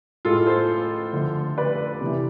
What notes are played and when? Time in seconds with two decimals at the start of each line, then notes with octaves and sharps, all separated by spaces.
0.25 A2 G#3 F4 A4
0.47 A4 C5
1.13 D3 F3 A3
1.58 B4 D5
2.01 C3 E3 A3